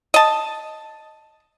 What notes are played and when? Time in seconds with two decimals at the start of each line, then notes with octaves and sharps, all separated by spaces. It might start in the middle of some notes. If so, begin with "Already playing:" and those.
0.14 D#5 A5